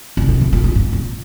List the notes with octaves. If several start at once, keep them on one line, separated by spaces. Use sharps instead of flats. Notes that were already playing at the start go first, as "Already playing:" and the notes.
C#3
C3
A#2
A#2
A#2
G#2
A#2